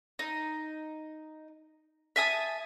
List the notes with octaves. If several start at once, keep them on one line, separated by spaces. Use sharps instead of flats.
D#4
E5 G#5 A5 D#6